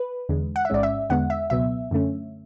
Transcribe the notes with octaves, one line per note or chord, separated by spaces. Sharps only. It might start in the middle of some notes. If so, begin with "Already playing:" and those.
Already playing: B4
E2 D3 G#3
F#5
E5
A1 G#2 G#3 C#4 D5
E5
E2 D3 G#3 B3 F#5
E5
C#2 B2 F#3 B3 E5
F#2 D3 A3 C#4